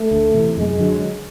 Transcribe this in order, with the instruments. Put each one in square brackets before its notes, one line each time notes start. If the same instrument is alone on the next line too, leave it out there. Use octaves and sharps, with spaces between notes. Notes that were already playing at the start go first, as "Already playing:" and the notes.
Already playing: [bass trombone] A3
[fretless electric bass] D2
C3 E3
[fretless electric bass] F#2 [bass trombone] G#3
[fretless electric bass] D3 F#3